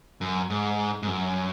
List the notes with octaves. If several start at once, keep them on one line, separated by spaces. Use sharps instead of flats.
F#2
G#2
G#2
F#2